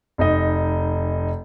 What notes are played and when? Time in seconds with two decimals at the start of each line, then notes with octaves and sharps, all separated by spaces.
0.18 F1 D#4 D#5